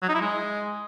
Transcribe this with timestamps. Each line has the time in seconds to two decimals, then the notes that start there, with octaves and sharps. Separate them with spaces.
0.02 F#3
0.09 D#4
0.15 E4
0.21 G#3